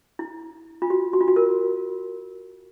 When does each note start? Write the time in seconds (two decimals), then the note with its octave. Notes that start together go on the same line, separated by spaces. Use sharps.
0.19 E4
0.82 F4
0.90 F#4
1.13 F#4
1.21 F4
1.28 F#4
1.36 A#4